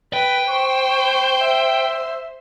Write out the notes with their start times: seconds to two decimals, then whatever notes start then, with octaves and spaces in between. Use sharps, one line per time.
0.13 B4 G5
0.49 C5 C#6
1.41 E5